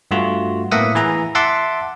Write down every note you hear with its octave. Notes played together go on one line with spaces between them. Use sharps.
G2 A3 F4 F#4
A2 A#3 B3 E5 F#5 D#6
E3 G#4 A#5
E5 F#5 A5 C6 D6